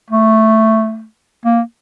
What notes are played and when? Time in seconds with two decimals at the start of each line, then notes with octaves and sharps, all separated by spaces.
0.10 A3
1.45 A#3